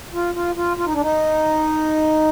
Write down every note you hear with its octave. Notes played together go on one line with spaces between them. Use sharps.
F4
F4
F4
F4
D#4
D4
D#4